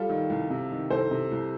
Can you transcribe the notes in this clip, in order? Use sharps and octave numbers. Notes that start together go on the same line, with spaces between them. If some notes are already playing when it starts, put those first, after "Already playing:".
Already playing: G3 F4 A4
D#3
C2
C3
D#3
C2 A4 C5
C3
C2